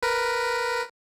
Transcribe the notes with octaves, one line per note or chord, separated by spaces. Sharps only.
A#4 B4